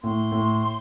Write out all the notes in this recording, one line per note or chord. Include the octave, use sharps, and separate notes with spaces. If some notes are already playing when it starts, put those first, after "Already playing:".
A2 C6
A2